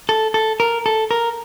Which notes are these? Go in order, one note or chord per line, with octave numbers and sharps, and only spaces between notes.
A4
A4
A#4
A4
A#4